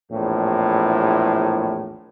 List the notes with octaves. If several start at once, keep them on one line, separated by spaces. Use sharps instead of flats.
A#1 E2 A2